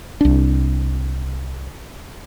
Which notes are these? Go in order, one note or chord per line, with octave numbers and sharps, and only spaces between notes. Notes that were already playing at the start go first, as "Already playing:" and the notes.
C2 D4